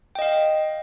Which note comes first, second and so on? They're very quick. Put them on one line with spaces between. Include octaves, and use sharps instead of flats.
G5 D#5 F5